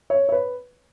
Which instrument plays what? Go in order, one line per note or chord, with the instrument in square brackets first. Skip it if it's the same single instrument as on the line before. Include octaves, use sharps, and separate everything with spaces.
[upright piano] C#5
C#5
B4